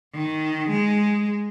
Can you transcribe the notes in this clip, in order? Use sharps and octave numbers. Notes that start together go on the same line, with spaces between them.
D#3
G#3